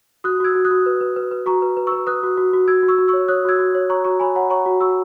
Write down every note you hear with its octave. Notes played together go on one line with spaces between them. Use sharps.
F#4 D#6 F#6
F#4 E6 G#6
F#4
D#6 F#6
F#4
B4
B4
B4
B4
F#4 A#5 C#6
B4
B4
C#6 E6
B4
B4 D#6 F#6
F#4
F#4
F#4
F#4 E6 G#6
F#4
C#6 E6
F#4
C#6 E6
C#5
C#5 D#6 F#6
F#4 E6 G#6
F#4
C#5
C#5 A#5 C#6
F#4 A#5 C#6
C#5 G#5 B5
C#5 F#5 A#5
C#5 A#5 C#6
F#4
F#4 C#6 E6